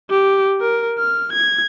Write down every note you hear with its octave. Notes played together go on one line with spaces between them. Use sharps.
G4
A#4
F6
G#6